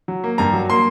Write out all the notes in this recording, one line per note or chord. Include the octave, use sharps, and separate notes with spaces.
F#3
A#3
G2 A#5
F#3
A#3 C6